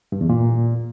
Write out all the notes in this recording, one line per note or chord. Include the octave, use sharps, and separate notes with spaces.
G2
E2
A#2